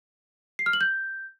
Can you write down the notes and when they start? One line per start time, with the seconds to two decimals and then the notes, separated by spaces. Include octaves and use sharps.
0.59 C7
0.66 F6
0.73 F#7
0.81 G6